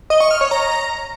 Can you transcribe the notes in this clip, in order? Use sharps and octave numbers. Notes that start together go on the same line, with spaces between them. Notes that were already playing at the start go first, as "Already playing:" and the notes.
D#5
C#6
F6
C#5
A#5